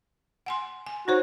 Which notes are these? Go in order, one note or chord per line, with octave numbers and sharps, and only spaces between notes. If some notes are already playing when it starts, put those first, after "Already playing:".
F#5 G#5 C6
G#5
D#4 F#4 C5 C#5